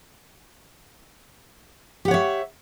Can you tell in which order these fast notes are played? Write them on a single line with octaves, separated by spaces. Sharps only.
G4 F#5 C#5 E5